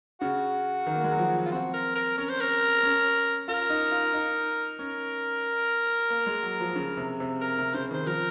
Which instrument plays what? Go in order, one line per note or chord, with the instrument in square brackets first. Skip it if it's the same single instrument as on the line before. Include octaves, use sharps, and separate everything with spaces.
[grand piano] C#3 [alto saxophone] F#4
[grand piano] D#3
A#3
G#3
F#3
F3
[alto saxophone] F4
[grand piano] C4 [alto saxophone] F#4
[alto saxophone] A#4
A#4
[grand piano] C#4 [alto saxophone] A#4
[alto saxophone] C5
A#4
[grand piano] C#4
[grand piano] F4 [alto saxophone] A#4
[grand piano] D#4
F4
D#4
[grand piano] C#4 [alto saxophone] A#4
[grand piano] A#3
G#3
F#3
F3
C#3
C3
C3
[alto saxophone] A#4
[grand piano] C3
[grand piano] C#3 [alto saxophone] C5
[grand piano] D#3 [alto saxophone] C5
[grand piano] F3 [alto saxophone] A#4